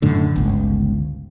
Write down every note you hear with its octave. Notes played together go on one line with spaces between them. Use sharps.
F#2 A2 D3
G1 C#2